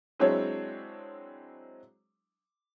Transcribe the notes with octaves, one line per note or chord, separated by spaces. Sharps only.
F#3 G#3 C4 D4 E4 C#5